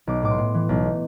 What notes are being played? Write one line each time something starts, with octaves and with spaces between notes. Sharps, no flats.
B1 D6
A2 D6
C6
A2
E3
B1